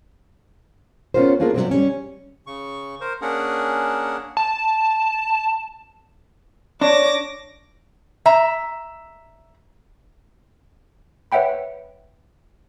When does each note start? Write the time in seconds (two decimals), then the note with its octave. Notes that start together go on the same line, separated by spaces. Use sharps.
1.14 B3 C#4 D4 F4 A#4 C5
1.40 A#3 D4 F4 G#4 A#4
1.54 C3 E3 F#3 G3 C4
1.71 G3 C#4
2.47 C#3 C#6
3.01 A#4 C5
3.22 A#3 C#4 D4 G#4 A#4 F#5
4.37 A5
6.81 D4 C#5 D6 A#6
8.26 E5 A#5
11.32 B4 C#5 E5 F#5 G5 B5